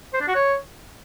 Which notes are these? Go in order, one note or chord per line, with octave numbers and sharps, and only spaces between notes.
C5
D4
F#4
C#5